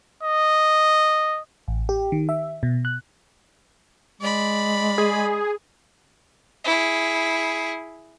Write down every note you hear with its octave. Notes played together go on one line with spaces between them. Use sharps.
D#5
A1
G4
D#3
E5
B2
F#6
G#3 D5 B5
G#4
E4 G#4